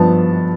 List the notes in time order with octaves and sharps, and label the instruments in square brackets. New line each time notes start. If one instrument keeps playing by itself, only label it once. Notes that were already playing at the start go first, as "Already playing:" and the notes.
Already playing: [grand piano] G2 F3 B3 A5